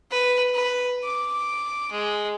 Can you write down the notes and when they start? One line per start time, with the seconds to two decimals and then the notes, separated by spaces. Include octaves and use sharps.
0.10 B4
0.55 B4
1.04 D6
1.92 G#3